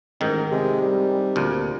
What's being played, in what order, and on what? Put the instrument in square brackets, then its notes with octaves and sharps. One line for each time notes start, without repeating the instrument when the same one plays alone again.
[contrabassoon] A1 [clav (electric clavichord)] G#2 D#3 [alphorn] A#4
[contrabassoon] C3 [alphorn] G#3
[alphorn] G3
[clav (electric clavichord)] D2 A#2